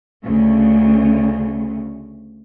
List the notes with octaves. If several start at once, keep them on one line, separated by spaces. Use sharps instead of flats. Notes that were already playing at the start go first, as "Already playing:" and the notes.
D2 C#3